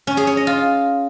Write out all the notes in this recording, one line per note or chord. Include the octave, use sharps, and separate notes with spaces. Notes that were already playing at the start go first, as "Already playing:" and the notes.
C#4
G#4
C#5
D#5
F4